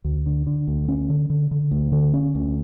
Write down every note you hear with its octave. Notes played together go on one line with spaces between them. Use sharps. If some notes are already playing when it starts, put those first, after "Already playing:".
D2
D3
D3
D2
C#4
D3
D3
D3
D2
D3
C#4
D2